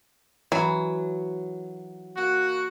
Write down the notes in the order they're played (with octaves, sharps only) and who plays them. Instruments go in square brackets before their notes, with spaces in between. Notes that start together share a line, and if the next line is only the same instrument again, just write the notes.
[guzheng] E3 [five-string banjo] F#3
[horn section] A#3 F#4